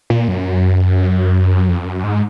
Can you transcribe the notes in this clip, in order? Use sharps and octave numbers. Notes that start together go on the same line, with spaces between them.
A#2
F#2
F2
F#2
G#2